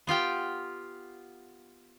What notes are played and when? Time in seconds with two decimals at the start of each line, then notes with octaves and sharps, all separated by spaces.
0.07 B3 F4 G4 G5